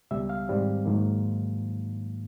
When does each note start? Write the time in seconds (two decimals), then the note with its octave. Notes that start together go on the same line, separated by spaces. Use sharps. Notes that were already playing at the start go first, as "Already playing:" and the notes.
0.11 C#2 B2 G3 E5
0.29 F5
0.49 G#2 D#3 G3 C4
0.85 G#2 D#3 F#3 A#3